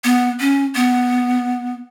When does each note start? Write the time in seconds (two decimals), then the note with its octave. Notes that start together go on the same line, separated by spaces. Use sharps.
0.04 B3
0.40 C#4
0.75 B3